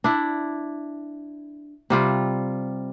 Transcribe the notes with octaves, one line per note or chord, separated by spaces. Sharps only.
D4 E4
C3 G3 F4